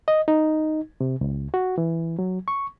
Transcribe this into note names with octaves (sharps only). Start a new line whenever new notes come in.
D#5
D#4
C3
C#2
F#4
E3
F#3
C#6